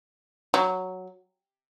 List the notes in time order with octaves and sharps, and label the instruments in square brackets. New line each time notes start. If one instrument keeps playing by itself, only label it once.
[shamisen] F#3